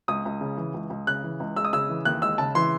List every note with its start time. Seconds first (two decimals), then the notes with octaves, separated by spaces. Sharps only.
0.08 C#2 D#6
0.25 C#2
0.41 C#3
0.57 E3
0.74 C#2
0.90 C#2
1.07 C#3 F#6
1.24 E3
1.40 C#2
1.56 G#3 E6
1.65 D#6
1.73 C#3 E6
1.89 E3
2.05 D#2 F#6
2.22 G#3 E6
2.38 C#3 A5
2.55 E3 C6